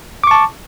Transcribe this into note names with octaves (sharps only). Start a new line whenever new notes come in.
A5 C#6 D6